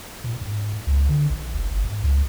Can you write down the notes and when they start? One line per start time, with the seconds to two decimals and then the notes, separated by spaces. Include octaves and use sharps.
0.24 A#2
0.41 G#2
0.87 C#2
1.09 D3
1.30 A#1
1.54 F1
1.70 G1
1.84 G#2
2.03 C#2